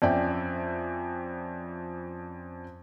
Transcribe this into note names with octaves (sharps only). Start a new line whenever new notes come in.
F2 C#4 D5 E5 G5